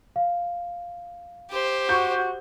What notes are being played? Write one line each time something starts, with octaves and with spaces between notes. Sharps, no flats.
F5
G4 C5
F#4 C#6 G6